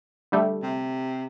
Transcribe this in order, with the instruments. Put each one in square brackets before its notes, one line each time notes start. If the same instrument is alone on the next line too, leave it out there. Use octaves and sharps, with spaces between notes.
[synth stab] D3 G3 A3
[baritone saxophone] C3